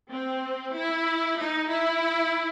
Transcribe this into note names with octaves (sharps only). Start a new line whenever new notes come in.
C4
E4
D#4
E4